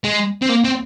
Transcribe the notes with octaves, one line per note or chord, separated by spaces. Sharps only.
G#3
C4
A#3
C4